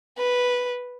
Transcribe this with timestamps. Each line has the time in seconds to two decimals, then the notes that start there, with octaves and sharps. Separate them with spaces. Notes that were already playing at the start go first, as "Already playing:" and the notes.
0.18 B4